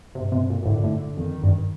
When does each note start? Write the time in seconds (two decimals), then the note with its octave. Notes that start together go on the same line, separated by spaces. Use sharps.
0.15 G2 C3
0.32 C3
0.50 A#2
0.62 A#2
0.66 A2 D3
0.84 A2
1.17 F2 D#3
1.43 G2